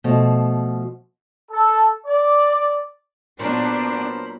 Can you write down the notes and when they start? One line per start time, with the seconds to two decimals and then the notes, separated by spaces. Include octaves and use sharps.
0.04 B2 F3 A3
1.51 A4
2.07 D5
3.39 A#2 F#3 B3 D4 A#4 C5 B5